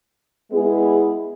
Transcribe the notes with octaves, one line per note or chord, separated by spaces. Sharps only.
G#3 B3 E4 G#4